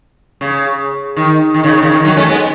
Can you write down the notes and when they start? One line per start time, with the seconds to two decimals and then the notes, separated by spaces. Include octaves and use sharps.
0.41 C#3
1.16 D#3
1.54 D#3
1.64 C#3
1.73 D#3
1.82 C#3
1.91 D#3
2.04 D#3 F#3
2.17 A3 C#4
2.29 G#3 B3